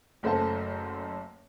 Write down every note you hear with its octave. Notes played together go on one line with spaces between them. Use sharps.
F#1 F#2 A3 C5 F#5 A5